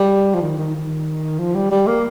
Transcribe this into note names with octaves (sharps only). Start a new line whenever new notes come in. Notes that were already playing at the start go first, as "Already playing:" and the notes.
Already playing: G3
F3
D#3
D#3
D#3
F3
G3
G3
A#3